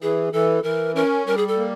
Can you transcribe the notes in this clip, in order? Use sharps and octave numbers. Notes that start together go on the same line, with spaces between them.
E3 G#4
E3 A4
E3 A#4
C#4 A#4
G3 A#4
G#4
A4
A#3